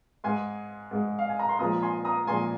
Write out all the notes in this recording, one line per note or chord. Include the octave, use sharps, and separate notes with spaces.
G#2 G#3 G#5 C6
G#2 G#3
F5
G#5
A#5
C6
A#2 F3 G#3 A#5 D#6
G#5 C6
A#5 D#6
A#2 F3 G#3 G#5 C6